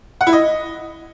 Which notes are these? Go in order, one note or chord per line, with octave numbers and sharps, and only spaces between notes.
F#5
E4
D#5